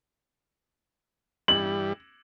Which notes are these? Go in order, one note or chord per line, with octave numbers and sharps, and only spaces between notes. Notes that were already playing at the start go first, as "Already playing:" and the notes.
G2 E3 G3 F#7